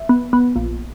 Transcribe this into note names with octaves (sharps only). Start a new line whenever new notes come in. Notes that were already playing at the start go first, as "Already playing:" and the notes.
Already playing: E5
B3
B3
A#1